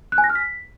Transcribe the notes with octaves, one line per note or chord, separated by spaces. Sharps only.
F#6
G#5
A#6
F6
B6